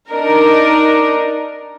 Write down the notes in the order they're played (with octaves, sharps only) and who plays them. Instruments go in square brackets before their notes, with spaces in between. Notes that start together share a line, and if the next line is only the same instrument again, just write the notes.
[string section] D4 D#4 A#4